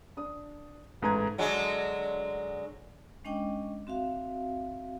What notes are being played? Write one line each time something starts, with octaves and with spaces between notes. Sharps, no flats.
D4 D#6
A1 G#2 A4 B4 A#5 G#6
D3 F#3 G#3
G#3 C#4 D4 D#5 G5 D6
C4 F#4 E5 F5